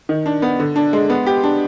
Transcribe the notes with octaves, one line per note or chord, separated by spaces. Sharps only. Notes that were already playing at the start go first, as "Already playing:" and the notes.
D#3
D4
B3
D3
D4
G#3
B3
G4
D4